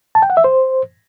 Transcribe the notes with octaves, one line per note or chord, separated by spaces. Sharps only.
A5
G5
F#5
E5
C5